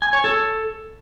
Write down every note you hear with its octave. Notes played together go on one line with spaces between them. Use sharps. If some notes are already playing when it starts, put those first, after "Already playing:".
G#5
C#5
A4